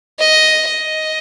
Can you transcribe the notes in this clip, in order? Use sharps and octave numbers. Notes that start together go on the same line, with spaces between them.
D#5
D#5